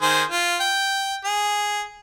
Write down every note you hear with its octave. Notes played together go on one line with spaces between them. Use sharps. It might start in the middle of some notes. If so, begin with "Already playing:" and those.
D#3 G#4 C5
F4
G5
G#4